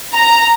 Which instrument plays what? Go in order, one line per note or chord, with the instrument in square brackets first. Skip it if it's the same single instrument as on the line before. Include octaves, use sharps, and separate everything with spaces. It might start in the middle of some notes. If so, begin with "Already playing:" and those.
[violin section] A#5